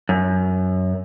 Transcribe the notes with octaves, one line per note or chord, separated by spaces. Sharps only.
F#2